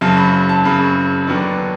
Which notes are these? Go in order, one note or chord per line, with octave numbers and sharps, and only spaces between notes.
F#1 F#2 C#3 F#3 A5
B5
A5
F#1 F#2 C#3 F#3 B5
D#2 D3 F#3 B3 D4